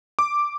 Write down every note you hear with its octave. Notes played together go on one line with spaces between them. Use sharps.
D6